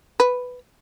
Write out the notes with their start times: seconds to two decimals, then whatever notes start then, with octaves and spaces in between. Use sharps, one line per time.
0.20 B4